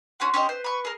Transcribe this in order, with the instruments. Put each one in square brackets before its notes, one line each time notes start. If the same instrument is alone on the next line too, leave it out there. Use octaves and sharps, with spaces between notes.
[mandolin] C#4 F#4 F#5 [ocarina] C6
[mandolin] C#4 G4 D#5
[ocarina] B4 [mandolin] C5
[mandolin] B5 C#6
G#4 A#4